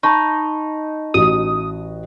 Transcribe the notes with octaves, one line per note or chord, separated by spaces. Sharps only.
D#4 A5 B5 C#6
A1 F#4 D#6